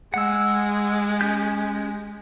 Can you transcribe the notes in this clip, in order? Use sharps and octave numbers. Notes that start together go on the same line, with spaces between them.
G#3 F#5 E6
C#4 G4 G6